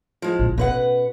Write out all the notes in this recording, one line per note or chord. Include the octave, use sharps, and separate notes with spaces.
F3 G#3
A#1
B2 C#4 B4 F#5